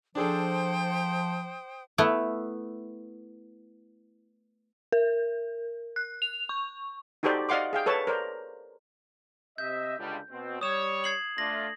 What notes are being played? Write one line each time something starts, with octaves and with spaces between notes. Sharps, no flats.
F3 D4 G#4 A4 C5 G5 D#6
A3 B3 E4
A#4
F#6
F7
C#6
D#4 F#4 G4 A4 C5 D5
D5 D#5 F5 F#5 C6 D6
G#4 F5 G5
A4 B4 C#5 A5
A#4 C5 D5
C3 D#5 E5 G6
C#2 D3 G3
B2 C4
G3 C#5 D#6 E7
G#6 C7 F#7
A3 D4 F4 A#6 F#7